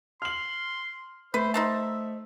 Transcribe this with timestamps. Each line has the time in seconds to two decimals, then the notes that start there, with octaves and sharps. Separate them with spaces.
0.22 C6 F6 F#7
1.34 A3 B4 C5
1.54 D#4 C5 E5 A5